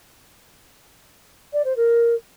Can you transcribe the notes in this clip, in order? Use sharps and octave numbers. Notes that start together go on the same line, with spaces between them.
D5
C5
A#4